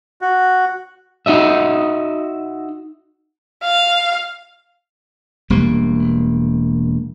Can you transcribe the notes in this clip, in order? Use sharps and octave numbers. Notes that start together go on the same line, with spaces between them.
F#4
D#4 F#4 D#5 E5
F5
E1 G3 A#3